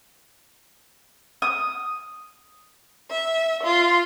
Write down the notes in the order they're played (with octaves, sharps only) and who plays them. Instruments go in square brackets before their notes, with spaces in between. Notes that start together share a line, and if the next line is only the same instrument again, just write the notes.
[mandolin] D#6
[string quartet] E5
F4